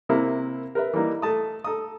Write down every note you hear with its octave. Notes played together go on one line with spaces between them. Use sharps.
C3 A#3 E4 A#4
A#4 B4 E5
E3 G3 A#3 D#4
A3 A5 D#6
A4 A#5 D#6